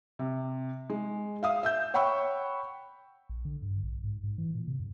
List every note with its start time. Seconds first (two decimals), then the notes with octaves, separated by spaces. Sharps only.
0.19 C3
0.90 G#3
1.43 E5 F5 D#6
1.63 E5 E6 G6
1.94 C#5 F#5 G5 B5 C#6 E6
3.29 A#1
3.45 D3
3.62 G2
3.83 A#1
4.04 G#2
4.24 G#2
4.38 E3
4.54 A#2
4.68 C3
4.80 F#2